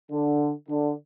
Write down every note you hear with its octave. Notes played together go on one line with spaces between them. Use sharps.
D3
D3